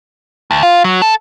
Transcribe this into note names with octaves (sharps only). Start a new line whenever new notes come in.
D2
F4
F#3
A4